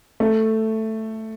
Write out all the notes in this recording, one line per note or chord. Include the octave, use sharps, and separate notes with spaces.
A3